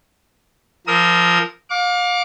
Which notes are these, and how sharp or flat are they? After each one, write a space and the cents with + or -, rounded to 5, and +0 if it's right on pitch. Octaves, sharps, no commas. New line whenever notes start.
F3 -10 A#4 +0 D#6 +45
F5 +35 D6 -15